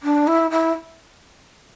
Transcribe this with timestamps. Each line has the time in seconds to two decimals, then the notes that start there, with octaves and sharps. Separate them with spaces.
0.03 D4
0.27 E4
0.50 E4